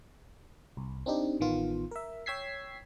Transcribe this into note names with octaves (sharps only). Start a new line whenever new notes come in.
C2
C4 D4 D#4 G4
A1 D#3 B3 F4
A#4 E5
C#5 G5 E6 G#6 B6 C7